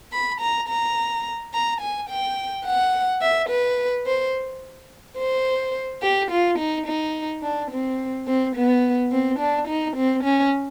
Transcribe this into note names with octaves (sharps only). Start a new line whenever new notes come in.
B5
A#5
A#5
A#5
G#5
G5
F#5
E5
B4
C5
C5
G4
F4
D#4
D#4
D4
C4
C4
B3
C4
D4
D#4
C4
C#4